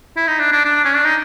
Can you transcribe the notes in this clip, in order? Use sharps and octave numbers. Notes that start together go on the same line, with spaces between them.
E4
D#4
D4
D4
D4
C#4
D4
D#4